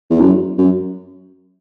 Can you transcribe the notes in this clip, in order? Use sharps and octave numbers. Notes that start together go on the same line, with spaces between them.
E2
F#2
F#2